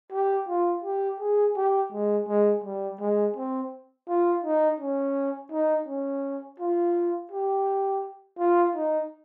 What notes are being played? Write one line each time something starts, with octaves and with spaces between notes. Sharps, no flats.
G4
F4
G4
G#4
G4
G#3
G#3
G3
G#3
C4
F4
D#4
C#4
D#4
C#4
F4
G4
F4
D#4